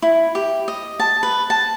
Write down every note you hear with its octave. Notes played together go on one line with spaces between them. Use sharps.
E4
G4
D#5
A5
B4
A5